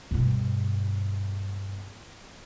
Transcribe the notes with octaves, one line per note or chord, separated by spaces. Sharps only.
G2 B2